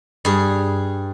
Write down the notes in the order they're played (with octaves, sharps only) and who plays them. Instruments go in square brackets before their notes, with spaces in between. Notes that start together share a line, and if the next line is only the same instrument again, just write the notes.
[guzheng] G2 G#4